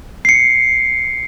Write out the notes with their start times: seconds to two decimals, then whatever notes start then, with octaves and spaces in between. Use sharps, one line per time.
0.25 C7 C#7